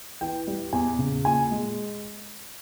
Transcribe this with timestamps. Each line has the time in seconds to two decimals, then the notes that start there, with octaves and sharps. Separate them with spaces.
0.21 E3 G5
0.48 G3
0.73 E2 G#5
0.99 C#3
1.25 A#2 G#5
1.51 G#3